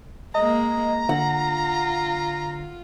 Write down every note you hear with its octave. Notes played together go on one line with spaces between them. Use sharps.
G#3 A#3 D#5 A#5
D3 F4 F#5